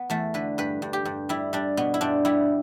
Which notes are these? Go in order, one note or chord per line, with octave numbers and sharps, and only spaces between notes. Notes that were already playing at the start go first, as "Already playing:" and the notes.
Already playing: B3
E2 A3
D3 B4
G2 B4
G2
G4
G2
G3 E4
G3 D4
B2 B3
E4
G2 D4
G3 E4